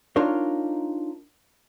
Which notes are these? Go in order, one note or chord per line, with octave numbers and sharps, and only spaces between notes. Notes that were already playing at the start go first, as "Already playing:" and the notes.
D4 D#4 F4 A#4 C#5